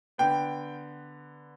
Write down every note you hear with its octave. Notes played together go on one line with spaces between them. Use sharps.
D3 B3 G5